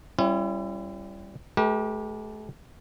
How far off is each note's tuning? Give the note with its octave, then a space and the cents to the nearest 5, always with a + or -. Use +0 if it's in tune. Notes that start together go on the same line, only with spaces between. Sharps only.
G3 +0 C#4 -30 E4 +35
A3 -45 G4 -5 B4 -45